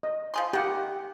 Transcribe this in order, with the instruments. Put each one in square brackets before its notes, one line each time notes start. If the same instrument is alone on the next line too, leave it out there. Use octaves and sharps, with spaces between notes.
[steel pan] D#5
[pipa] F3 G#4 C6
[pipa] D#3 A#3 [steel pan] G4 F#5